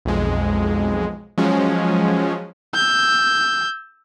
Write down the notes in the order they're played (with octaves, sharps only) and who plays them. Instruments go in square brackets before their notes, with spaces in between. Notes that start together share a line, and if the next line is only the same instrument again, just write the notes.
[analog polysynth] B1 F2 G#3
F3 F#3 G#3 C#4
[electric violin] E6 G6